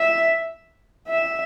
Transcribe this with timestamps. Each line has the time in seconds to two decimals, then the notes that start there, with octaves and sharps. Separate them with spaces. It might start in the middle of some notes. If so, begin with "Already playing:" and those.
Already playing: E5
1.08 E5